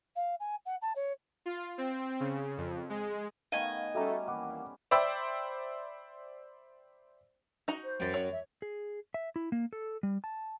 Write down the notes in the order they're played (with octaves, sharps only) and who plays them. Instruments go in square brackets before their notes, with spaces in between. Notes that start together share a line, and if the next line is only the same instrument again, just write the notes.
[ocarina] F5
G#5
F#5
A5
C#5
[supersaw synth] F4
C4
C#3
F2
G#3
[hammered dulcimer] D#3 A3 B3 [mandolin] D#5 G#5 [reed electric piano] F5
[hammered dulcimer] G3 C#4 [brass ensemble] A3 A4 [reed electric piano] F#4 E5 A#5
[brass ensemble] D#2 E3 A#3 [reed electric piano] F#5 D6
[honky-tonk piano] C5 D5 E5 G5 B5 E6
[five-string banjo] D#4 F#4 A#5
[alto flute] C5
[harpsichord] F#2 G5
[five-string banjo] C#5
[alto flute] E5
[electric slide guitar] G#4
E5
E4
A#3
A4
G3
A5